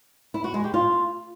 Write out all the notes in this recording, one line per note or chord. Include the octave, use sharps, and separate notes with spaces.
E4
F#4
G#3
G4
F4